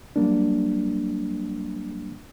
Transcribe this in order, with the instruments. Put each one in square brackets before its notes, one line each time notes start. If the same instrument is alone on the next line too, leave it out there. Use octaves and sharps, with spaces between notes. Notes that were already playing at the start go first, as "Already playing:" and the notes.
[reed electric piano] F#3 G3 A#3 D4